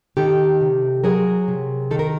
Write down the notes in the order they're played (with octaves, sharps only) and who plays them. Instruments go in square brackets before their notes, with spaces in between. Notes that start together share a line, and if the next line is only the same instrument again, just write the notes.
[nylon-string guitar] D#3 G4 A4
C3
F#3 G#4 A#4
C3
D#3 A4
A#4